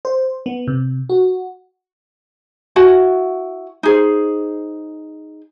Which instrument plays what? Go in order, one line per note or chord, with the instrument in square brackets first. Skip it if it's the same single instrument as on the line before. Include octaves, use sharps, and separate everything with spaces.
[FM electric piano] C5
B3
C3
F#4
[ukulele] E4 F#4 F#5 G#5
D#4 G#4 C5